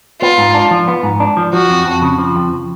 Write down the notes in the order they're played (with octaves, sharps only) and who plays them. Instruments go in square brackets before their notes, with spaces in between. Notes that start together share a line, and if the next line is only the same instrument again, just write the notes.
[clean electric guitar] B3 [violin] F4
[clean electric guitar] G#2
D4
F3
B3
G#2
D4
F3
[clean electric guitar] F3 [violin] F#4
[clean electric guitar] F2
F2
C#3
F3
F2